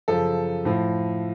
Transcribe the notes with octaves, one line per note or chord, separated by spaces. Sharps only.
F#2 C#3 F3 A4
A2 F3